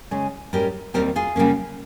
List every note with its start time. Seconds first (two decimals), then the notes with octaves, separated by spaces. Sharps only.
0.11 C#3 G#3 C#4
0.53 G#2 G3 C#4 G4 A#4
0.94 D#2 D#3 G3 C4 G4 A#4
1.16 F4 G#4
1.36 C#3 G3 A#3 C#4